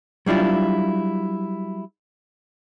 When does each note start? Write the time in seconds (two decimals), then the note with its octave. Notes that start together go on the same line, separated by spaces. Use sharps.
0.26 F#3 G3 D4 E4 F4